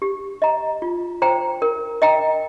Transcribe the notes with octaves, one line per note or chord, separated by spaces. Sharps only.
G4
D#5 A#5
F4
C5 G5 A#5
A#4
D#5 G5 A#5